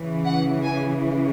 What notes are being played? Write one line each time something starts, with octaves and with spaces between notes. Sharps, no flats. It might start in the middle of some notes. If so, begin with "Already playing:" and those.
Already playing: C#3 E3
F#5
G#5